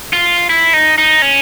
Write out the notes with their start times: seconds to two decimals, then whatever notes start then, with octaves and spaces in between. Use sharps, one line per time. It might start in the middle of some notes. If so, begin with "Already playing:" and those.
0.13 F4
0.49 E4
0.73 D#4
0.98 D#4
1.22 C#4